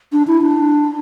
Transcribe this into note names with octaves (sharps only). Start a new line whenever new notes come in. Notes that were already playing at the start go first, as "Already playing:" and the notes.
D4
E4
D4